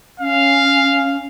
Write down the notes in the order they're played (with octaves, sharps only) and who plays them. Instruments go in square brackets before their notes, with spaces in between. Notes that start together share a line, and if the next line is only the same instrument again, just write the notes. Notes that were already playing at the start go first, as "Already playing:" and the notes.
[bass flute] C#4 [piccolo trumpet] F5